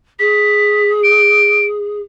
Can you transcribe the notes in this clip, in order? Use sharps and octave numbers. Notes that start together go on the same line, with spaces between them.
G#4 B6
D7